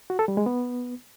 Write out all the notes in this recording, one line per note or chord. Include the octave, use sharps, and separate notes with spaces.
F#4
A4
G3
G#3
B3